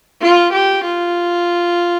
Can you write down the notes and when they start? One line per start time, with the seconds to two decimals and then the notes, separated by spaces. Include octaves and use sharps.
0.21 F4
0.52 G4
0.84 F4